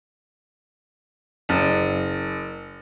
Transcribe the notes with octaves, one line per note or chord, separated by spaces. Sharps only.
F#1